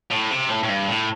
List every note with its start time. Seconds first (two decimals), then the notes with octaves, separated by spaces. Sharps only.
0.11 A2
0.31 C3
0.49 A2
0.63 A2
0.69 G2
0.88 A2